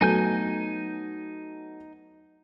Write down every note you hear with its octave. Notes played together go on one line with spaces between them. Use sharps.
F#3 A3 B3 D#4 G#5 G6